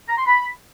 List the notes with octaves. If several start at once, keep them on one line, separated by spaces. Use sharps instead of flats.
A#5
C6
B5